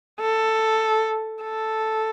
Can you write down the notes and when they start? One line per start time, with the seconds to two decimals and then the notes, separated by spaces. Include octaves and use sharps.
0.21 A4
1.43 A4